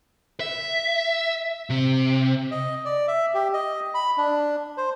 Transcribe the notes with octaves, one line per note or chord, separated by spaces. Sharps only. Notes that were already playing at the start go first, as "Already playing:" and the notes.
E5
C3
D#5
D5
E5
G4
D#5
B5
D4
C5